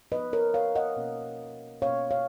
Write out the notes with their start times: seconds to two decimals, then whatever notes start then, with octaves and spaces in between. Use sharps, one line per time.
0.12 F3 B3 D#4 B4 D#5
0.33 A#4 C#5
0.54 C#5 F5
0.75 D#5 F#5
0.97 B2 A#3 C#4
1.82 B2 A#3 C#4 C#5 F5
2.11 C#5 F5